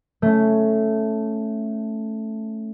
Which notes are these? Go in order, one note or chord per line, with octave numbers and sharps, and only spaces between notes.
A3 C#4